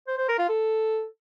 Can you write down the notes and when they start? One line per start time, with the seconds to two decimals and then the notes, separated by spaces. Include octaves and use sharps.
0.07 C5
0.18 C5
0.28 A#4
0.38 F4
0.49 A4